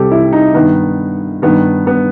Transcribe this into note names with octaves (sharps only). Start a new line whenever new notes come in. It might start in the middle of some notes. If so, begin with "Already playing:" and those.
Already playing: C2 C3 G4 A4
E4
D#4
G2 D#3 B3
G2 D#3 B3
B3